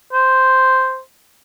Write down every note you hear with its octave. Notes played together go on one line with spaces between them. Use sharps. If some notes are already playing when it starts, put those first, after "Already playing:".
C5